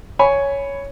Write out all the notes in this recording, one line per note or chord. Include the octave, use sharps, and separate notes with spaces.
C#5 G#5 B5